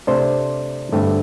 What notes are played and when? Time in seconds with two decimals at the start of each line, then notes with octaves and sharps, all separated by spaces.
0.07 C3 A3 D4 C5
0.93 G2 D3 A3 C4